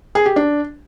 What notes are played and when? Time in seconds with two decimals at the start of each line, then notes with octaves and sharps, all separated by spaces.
0.15 G#4
0.26 G4
0.36 D4